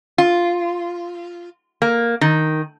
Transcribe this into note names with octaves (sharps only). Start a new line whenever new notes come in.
F4
A#3
D#3